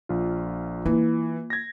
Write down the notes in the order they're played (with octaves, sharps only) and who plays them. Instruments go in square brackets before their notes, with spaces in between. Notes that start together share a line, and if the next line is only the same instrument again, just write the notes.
[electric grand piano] A#1 F4
[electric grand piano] E3 [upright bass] A#3 F4
[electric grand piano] G#6 A#6